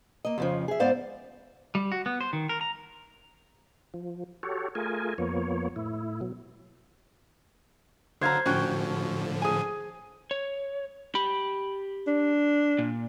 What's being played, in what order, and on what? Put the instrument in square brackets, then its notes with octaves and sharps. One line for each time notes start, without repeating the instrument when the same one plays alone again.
[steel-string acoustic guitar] A#3 D#5
F2 C#3 F3
G#4 E5
G#2 B3 C5 D5 F5
[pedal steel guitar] G3
F#4
B3
C5
D#3
A#4
A#5
[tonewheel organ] F3
F#4 G4 A4 C#5
A3 F4 G#4 A#4 G#5
F2 F3 A#3 B3 C#5
A2 E4
B2 F#3
[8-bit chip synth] D3 [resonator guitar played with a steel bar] F#3 F5 A#5 [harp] C5 G#6
[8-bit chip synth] A2 D3 F3 [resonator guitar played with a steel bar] C#4 F#4 G5
[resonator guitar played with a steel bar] G#4 G#5
[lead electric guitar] C#5
G4 B5
[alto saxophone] D4
[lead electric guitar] A#2